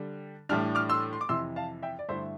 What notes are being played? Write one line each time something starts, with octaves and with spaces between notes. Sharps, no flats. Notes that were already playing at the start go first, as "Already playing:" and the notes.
Already playing: D3 G3 D4
A2 E3 G3 D4 F6
D6 F6
C6 E6
C6
D6
F2 C3 E3 C6 E6
F5 A5
E5 G5
D5
G2 D3 A3 E4 C5 E5